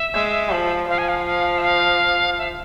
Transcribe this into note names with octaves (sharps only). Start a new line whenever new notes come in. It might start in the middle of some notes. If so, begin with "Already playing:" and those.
Already playing: E5
G#3
F3
F3 F5
G#5
F5
F5
E5
F5
E5